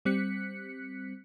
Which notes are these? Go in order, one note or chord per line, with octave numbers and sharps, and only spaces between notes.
G3 C4 F#6 B6 C#7